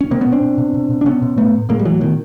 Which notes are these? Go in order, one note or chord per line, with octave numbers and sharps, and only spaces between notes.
C#4
B2 A#3 C4
B3 C#4
B2
C4 D4
B2
B2
B2
B2
D4
B2 B3 C#4
B2
A2 A3 B3
A2
A2 G#3 A#3
G3
A2 E3 F#3
B2 D#3